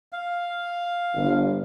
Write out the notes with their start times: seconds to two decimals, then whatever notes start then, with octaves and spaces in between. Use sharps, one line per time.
0.13 F5
1.14 G1